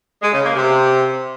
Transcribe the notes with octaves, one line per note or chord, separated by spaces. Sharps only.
G#3
C#3
A#3
C3